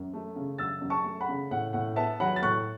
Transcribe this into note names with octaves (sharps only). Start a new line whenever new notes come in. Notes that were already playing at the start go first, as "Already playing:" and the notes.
Already playing: F#2
A3
C#3
F#2 E6 A6
F#2
A5 C#6
A3
F#5 B5
C#3
A2 F#5
A2 F#5
B3 E5 A5
F#3 F#5 B5
A6
A2 C#6 F#6